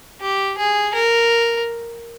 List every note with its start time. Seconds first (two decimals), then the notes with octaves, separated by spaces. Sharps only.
0.21 G4
0.58 G#4
0.94 A#4